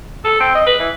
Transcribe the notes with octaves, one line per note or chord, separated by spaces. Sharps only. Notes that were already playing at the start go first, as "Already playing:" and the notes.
A4
C4
D#5
B4
E3